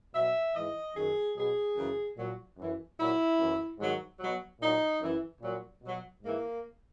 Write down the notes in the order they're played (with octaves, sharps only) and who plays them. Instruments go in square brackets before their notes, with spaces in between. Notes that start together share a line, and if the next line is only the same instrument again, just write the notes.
[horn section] B2 F#3 E5
G#2 E3 D#5
F#2 D#3 F#3 G#4
B2 F#3 G#4
F#2 C#3 E3
A#2 F#3
F#2 E3
A#2 F#3 E4
F#2 E3
G#2 D#3 F#3
B2 F#3
A#2 F#3 D#4
F#2 E3
A#2 F#3
B2 F#3
G#2 E3 A#3